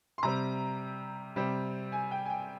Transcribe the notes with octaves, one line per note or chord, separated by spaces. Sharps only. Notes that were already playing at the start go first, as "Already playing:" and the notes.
C6
C3 G3 C4 A#5
C3 G3 C4
G#5
G5
G#5
G5